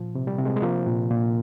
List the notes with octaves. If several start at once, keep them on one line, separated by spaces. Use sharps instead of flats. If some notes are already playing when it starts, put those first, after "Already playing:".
Already playing: A#2 F3
C3
G3
C3
G#3
G#3
F3 A#3
A#2
A#2